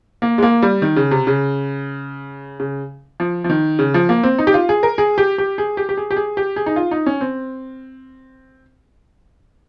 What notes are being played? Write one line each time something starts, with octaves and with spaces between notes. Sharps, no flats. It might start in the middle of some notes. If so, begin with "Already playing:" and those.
A#3
G#3
A#3
G3
D#3
C#3
C3
C#3
C#3
F3
F3
D#3
C#3
F3
A#3
C4
D#4
G4
F4
G#4
A#4
G#4
G4
G4
G#4
G4
G4
G#4
G4
G#4
G4
G#4
D#4
F4
D#4
C#4
C4